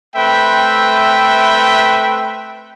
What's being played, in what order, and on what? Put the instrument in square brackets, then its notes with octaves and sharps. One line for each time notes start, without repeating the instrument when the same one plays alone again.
[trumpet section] A3 C4 B4 E5 G5